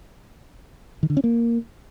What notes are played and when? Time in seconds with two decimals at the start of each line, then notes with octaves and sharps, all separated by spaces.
1.03 D#3
1.10 D3
1.17 C#4
1.24 A#3